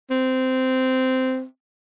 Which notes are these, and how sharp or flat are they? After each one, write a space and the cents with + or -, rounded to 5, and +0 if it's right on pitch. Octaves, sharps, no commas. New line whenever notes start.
C4 -15